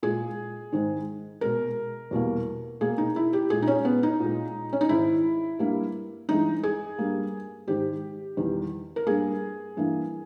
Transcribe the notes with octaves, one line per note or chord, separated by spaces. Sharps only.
A#2 G#3 G#4
G#2 D#3 G#3
B2 G#3 A#4
E2 B2 G3 A#3
B2 A#3 G#4
D#4
E4
G4
A#2 G#3 G#4
D#4
C#4
B3
D#4
A#2 G#3
C#4
D#4
G#2 D#3 G#3 E4
G2 G3 A#3
G2 E3 G#3 D#4
G#4
G2 G3 A#3
G#2 D#3 G#3 G4
E2 D#3 G3
A#4
G2 G3 A#3 G#4
G2 E3 A#3